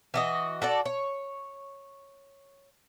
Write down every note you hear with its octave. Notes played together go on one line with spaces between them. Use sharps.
E3 F#4 D#5
F#4 A4 D5
C#5